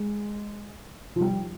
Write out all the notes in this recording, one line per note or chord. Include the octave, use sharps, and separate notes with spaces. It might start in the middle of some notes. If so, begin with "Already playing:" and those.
Already playing: G#3
F3
G3